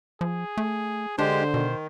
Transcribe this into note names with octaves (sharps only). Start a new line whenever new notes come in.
F3 G#4
A3
D3 G#3 D4 G4 C5
B2 D#3